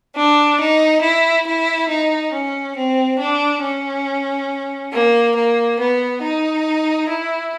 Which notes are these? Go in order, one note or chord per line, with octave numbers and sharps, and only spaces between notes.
D4
D#4
E4
E4
D#4
C#4
C4
D4
C#4
A#3
A#3
B3
D#4
E4